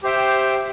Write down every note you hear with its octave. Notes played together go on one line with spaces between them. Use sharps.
G4 C5 E5 G5